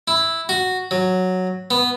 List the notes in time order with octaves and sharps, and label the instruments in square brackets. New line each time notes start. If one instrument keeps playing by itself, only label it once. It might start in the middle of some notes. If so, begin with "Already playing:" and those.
[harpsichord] E4
F#4
F#3
B3